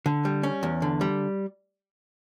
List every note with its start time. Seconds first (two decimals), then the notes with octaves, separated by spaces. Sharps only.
0.06 D3
0.25 G3
0.43 C#4
0.63 E2
0.82 D3
1.01 G3